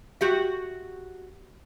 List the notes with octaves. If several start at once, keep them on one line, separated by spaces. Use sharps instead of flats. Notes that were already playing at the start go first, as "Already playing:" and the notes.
F#4 G4 E5